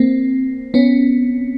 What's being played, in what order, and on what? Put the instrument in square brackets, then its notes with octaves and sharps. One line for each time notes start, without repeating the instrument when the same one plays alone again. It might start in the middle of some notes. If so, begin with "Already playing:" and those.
Already playing: [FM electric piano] A#3 C4
B3 C#4